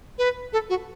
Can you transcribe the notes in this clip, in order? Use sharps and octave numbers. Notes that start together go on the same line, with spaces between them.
B4
A4
F#4